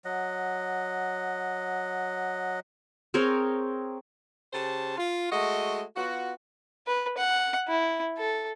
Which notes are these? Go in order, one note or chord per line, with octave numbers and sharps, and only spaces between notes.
F#3 D#5 F#5
C4 G#4 A#4 C#5
C#3 G4 C5 A5
F4
G#3 A3 F#4 D#5
B3 F4 F#4
B4
F#5
E4
A4